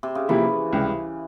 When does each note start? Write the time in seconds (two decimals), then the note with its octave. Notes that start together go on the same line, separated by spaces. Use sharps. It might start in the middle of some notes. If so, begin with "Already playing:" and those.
0.03 C3
0.15 C#3
0.28 C3 E3 F3 A#3 E4 G4
0.73 C#2 C3 G3